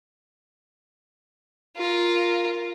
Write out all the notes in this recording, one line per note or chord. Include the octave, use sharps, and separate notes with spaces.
F4 A#4